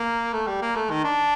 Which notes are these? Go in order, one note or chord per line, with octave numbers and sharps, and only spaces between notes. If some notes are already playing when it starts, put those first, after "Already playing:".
Already playing: A#3
A3
G3
A#3
A3
D#3
D4